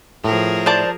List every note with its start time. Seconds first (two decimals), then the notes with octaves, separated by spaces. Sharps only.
0.24 A2 F3 G#4 A#4
0.66 C5 D5 A5